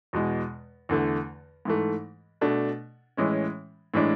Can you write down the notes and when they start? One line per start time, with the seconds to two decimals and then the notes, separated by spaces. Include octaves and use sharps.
0.13 E2 B2 G#3
0.89 E2 D3 A3
1.65 G#2 E3 A3
2.41 B2 A3 D4
3.17 A2 E3 G#3 C#4
3.94 A2 E3 G#3 D4